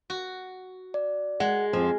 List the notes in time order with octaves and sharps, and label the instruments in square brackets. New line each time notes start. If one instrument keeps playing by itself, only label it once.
[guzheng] F#4
[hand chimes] D5
[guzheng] G#3 [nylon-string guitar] F#5
[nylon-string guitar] F2 F3 [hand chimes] G#5 F6